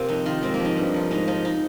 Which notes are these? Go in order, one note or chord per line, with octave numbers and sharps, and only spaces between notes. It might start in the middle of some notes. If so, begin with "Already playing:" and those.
Already playing: C3 A#3 C4 F4
F2 D#4
D#3 F4
G#2 C4
A#3
F3 D#4
G2
F3
G#2 D#4
F3 D#4
D#4